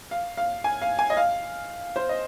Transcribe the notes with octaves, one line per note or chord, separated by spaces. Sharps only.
F5
F5
G#5
F5
G#5
D#5
F5
C5
D#5